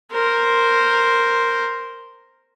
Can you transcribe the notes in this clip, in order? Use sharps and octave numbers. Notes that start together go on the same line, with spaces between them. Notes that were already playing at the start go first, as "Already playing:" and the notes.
A#4 C5